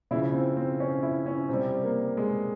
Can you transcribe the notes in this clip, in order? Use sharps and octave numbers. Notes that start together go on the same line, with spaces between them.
C#3 F3 E4
C4
C4
C#4
E4
C#4
C3 G3 C4
A#3
G#3